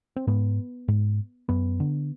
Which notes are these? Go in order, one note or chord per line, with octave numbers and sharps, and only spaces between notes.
C4
G#2 B3
G#2
F#2 B3
D3